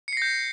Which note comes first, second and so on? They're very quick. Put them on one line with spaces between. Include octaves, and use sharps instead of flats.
C#7 C7 A#6 G6